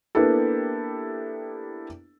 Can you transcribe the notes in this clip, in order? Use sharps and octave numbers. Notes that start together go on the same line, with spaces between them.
A#3 B3 D4 E4 G4 A4